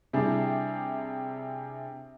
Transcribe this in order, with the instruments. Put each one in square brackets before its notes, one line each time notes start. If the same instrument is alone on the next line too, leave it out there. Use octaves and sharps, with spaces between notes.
[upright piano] C3 G3 D4 E4 G#4